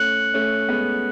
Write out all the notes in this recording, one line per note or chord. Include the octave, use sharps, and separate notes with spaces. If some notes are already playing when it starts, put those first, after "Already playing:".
Already playing: A3 C#4 F#6 C#7 F#7
A3 C#4
G#3 B3